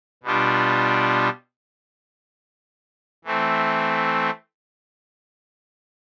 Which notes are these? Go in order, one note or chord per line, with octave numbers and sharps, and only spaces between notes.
B2 G3 D4 F4
E3 A3 C4